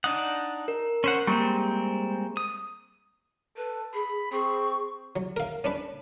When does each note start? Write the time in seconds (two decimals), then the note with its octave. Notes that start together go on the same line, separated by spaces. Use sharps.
0.04 D4 D#4 F#5 D#6
0.68 A#4
1.04 C#4 C5 F#5
1.27 G3 G#3 A#3 C4 A#5 C#6
2.37 D#6
3.57 A4 B4
3.94 G#4 B5
4.32 C4 G#4 C#6
5.16 F#3
5.37 A#4 F5
5.64 C#4 D4 B4